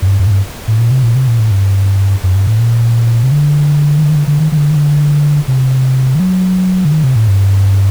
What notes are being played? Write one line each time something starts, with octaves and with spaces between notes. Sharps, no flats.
F#2
G2
F#2
A2
G2
A2
A#2
C3
A#2
C3
A#2
A2
G2
F#2
G2
A2
A#2
C3
D3
D#3
D3
D#3
D3
D3
D#3
D#3
D3
D#3
D3
C3
D#3
F#3
D3
D#3
C3
A2
G2